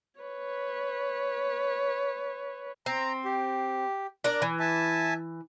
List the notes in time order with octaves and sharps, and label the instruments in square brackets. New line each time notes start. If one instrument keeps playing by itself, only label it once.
[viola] B4 C#5
[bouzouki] C4 [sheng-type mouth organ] A#5
[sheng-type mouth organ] G4
[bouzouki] D4 A#4 D5
E3
[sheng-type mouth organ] E5 G#5 A5